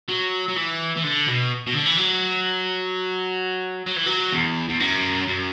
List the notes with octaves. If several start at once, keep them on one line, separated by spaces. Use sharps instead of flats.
F#3
F#3
E3
E3
D3
B2
B2
D3
E3
F#3
F#3
E3
F#3
E2
E2
F#2
F#2